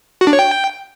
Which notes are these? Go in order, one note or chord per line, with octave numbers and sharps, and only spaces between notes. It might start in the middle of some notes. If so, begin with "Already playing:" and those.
F#4
D4
C#5
G5